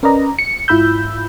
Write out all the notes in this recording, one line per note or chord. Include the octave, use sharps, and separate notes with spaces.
C#4 A#4 B4 D5 D#5 A#5
C#7
G#2 E4 F4 B5 E6 G6